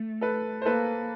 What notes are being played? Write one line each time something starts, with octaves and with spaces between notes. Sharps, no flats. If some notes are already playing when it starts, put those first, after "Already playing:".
Already playing: A3
A4 B4
C5
A#3 A4 B4